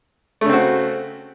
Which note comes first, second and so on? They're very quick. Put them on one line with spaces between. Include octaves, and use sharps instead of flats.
A3 C#3 C4 F#4